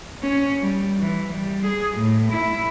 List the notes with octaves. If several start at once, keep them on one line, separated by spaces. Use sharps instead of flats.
C#4
G3
E3
G3
G#4
A2
E4